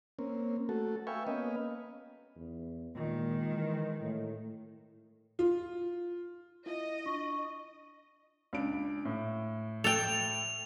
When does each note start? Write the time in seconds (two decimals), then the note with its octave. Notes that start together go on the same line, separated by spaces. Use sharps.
0.19 A#3 C4 C#4
0.69 A3 F#4 A4
1.07 B4 E5 F5 G5 G#5 C#6
1.27 A#3 B3 C#4 B4 D#5 F5
2.36 E2
2.96 A#2 D#3 G#3
3.54 E3
4.01 A2
5.39 F4
6.66 E4 F4 D#5
7.06 D4 C#6
8.53 C#2 D4 D7
9.05 A2
9.84 A4 G5 F7